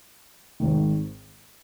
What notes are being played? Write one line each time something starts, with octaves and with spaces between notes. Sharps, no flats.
G#1 G#2 D#3